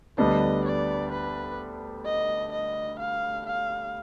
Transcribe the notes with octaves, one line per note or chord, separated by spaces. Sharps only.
D2 D3 G3 B3 D4 D#5
D5
B4
D#5
D#5
F5
F5